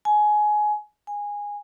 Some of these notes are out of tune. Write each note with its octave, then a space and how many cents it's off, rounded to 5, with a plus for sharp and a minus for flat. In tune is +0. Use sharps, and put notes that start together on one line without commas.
G#5 +20
G#5 -15